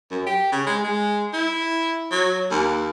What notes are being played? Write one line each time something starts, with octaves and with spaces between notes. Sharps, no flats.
F#2
G4
C#3
G#3
G#3
E4
F#3
D#2